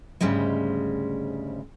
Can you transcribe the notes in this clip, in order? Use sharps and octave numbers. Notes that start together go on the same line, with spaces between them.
D2 G#2 C#3 G3 G#3